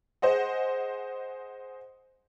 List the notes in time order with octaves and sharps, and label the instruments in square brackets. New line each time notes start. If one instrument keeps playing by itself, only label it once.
[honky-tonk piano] G#4 C5 D#5 F#5